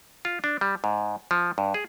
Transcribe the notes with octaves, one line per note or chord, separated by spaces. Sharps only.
F4
D4
G3
G#2
F3
G2
G#4